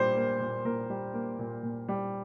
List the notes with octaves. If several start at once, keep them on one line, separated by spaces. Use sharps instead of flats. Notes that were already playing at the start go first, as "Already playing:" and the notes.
Already playing: A#2 G3 C5
A#3
A#2
A#2 A#4
G3
A#3
A#2
A#2
G3